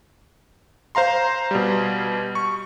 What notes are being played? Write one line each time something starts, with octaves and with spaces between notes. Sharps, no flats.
C5 F5 A#5 C6
B2 G3
C#6